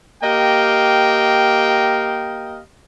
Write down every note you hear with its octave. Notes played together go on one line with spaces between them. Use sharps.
A#3 G4 D#5 F5 G5